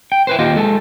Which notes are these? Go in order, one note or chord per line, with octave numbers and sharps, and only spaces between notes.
G5
E4 B4 C5
D#2 F4 G4 D#5
G#3 A4